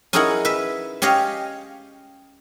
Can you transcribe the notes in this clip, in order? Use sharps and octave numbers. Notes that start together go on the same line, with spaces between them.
C#4 D#4 E4 G#4 A#4 F#5
B4 E5
C#4 G4 C#5 D#5 F5